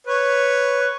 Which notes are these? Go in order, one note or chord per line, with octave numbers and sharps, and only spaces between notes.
B4 C#5